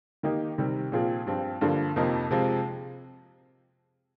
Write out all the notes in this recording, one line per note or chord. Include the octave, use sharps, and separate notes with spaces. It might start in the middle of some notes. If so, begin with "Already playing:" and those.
D#3 A#3 D#4 G4
C3 D#3 G3 C4
A#2 F3 C4 F4 G#4
G2 F3 C4
G2 D3 F3 A#3
F2 C3 F3 A#3 D#4
C3 F3 G#3 C4 F4